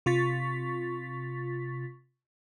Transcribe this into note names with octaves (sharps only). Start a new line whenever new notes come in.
C3 F4 C#6 A6 B6